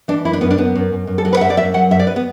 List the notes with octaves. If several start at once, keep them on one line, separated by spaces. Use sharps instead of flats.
E3 D4
F#2 E4
D4
F#2 B3
D4
F#2 B3
F#2
F#2
F#2
A4
F#3 F#4
B4
F#5
F#2 E5
D5
F#2 E5
F#3 F#5
F#2 E5
D5
B4
B3